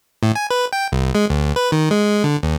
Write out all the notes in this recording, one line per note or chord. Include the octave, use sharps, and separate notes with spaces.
A2
G#5
B4
G5
C2
G#3
D2
B4
D#3
G#3
D3
D#2